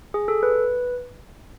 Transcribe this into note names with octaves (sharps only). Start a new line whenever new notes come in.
G#4
A4
B4